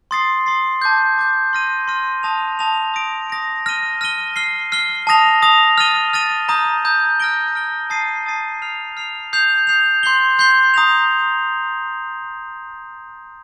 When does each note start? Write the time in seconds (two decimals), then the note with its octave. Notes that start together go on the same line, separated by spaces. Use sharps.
0.11 C6 D#6 A6 C7
0.46 C6 D#6 A6 C7
0.82 A5 D6 G6
1.18 A5 D6 G6
1.53 C6 F6 A#6 D#7
1.88 C6 F6 A#6 D#7
2.23 A5 D#6 A#6 F7
2.59 A5 D#6 A#6 F7
2.94 D#6 A#6 D7
3.30 D#6 A#6 D7
3.66 F6 A#6 D#7 G7
4.01 F6 A#6 D#7 G7
4.36 F6 C7 G7
4.72 F6 C7 G7
5.07 A5 D#6 A#6 F7
5.42 A5 D#6 A#6 F7
5.78 F6 A6 D#7 G7
6.13 F6 A6 D#7 G7
6.49 A#5 D#6 G6
6.85 A#5 D#6 G6
7.20 F6 A#6 D7 G7
7.55 F6 A#6 D7 G7
7.90 A5 D#6 A6 C7 D#7
8.26 A5 D#6 A6 C7 D#7
8.62 F6 C7 F7
8.97 F6 C7 F7
9.33 D#6 G6 C7 F7
9.67 D#6 G6 C7 F7
10.03 C6 G6 C7 G7
10.39 C6 G6 C7 G7
10.74 A#5 D#6 A#6 F7